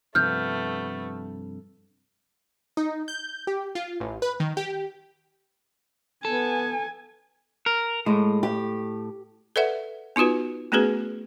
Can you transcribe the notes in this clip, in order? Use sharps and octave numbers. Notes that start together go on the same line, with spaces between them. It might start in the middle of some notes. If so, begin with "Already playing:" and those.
G2 C3 F3 A3 B3 F6 G6
D#4
G6
G4
F4
A1
B4
D#3
G4
B3 A4 G#5
A#4
A2 G#3
G4
A4 B4 D5 E5 F#5
B3 D#4 F4 F#4 B4
A3 B3 C#4 F#4 G#4 B4